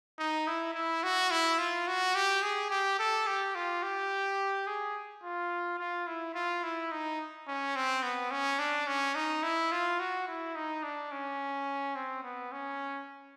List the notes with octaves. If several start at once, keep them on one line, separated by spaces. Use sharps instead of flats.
D#4
E4
E4
F#4
E4
F4
F#4
G4
G#4
G4
A4
G4
F4
G4
G#4
F4
F4
E4
F4
E4
D#4
C#4
C4
B3
C#4
D4
C#4
D#4
E4
F4
F#4
E4
D#4
D4
C#4
C4
B3
C#4